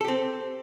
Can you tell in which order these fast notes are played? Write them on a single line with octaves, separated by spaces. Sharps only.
A4 G4 C4